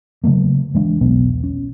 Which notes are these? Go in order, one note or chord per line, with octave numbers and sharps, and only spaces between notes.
C#3 F#3 A3 A#3
E3 G#3 D4
E1 B1 B3
C#4